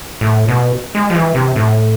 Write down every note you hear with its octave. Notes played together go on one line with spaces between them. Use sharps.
A2
B2
G#3
F3
E3
C3
A2